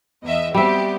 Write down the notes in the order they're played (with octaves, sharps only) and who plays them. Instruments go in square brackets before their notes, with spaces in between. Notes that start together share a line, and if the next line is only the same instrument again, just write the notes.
[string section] E2 D#5 E5
[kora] G3 E5 [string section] B3 C4 G4